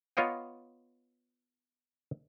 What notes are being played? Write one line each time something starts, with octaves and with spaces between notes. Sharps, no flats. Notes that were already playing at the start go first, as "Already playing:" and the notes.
B3 F4 C#5 D#5 F5 G5